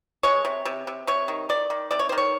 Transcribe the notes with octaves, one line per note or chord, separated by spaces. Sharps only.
G#3 C#5
C3
C3
C3
C3 C#5
D#3
D#3 D5
D#3
C3 D5
C#5
C5
D#3
C#5